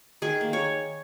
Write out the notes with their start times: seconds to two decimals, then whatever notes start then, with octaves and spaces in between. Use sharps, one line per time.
0.22 D#3 G#4
0.41 A#3
0.53 C#5